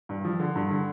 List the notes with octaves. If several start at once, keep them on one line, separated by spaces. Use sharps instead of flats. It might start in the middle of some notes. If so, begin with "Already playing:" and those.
G2
F3
D3
G2
D3